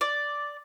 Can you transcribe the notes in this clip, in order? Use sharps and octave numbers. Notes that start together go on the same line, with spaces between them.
D5